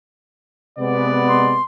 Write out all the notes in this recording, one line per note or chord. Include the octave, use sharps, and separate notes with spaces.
C3 G#3 B3 D5
C6